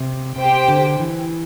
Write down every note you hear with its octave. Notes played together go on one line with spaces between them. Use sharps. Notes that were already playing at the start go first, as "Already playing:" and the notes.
Already playing: C3
C3 G4 C5 G5
D3
E3